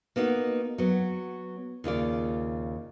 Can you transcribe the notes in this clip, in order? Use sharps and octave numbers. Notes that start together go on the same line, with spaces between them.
A#3 B3 D#4 F#4
F#3 B3
D#2 C#3 F4 D5